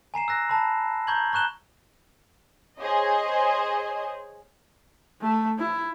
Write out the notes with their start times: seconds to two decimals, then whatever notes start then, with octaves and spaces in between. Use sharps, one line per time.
0.14 G#5 A#5 C7 E7
0.28 E6 F#6 A#6
0.49 A5 B5
1.07 A#5 C#6 G6 G#6 F#7
1.33 A#5 C#6 F#6 E7 G7
2.79 G#4 C5 C#5 D#5
5.22 A3
5.59 E4